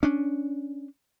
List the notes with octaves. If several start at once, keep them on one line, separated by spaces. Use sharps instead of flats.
C#4 D4